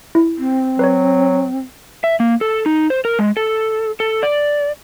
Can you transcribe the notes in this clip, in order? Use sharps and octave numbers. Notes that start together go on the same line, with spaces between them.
E4
C4
F#3 B4 C#5
E5
A#3
A4
D#4
C5
A#4
G#3
A4
A4
D5